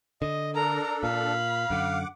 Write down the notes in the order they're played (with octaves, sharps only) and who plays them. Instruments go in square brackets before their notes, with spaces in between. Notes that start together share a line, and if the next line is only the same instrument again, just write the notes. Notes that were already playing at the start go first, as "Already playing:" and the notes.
[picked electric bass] D3 [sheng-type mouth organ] D#5
[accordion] D4 A4 [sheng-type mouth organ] A#4 [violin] A#5
[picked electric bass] A#2 [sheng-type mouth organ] F5 [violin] B5
[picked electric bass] F#2 D3 [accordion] F#5 D6